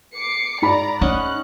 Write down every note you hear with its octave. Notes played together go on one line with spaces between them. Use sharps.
D6 C7 C#7
G#2 D5 A#5 B5
C#4 D#4 D#5 F#5 F#6